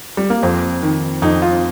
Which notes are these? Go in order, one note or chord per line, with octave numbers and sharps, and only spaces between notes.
G3
A#3
F2 C4
D#3
F2 D#4
F4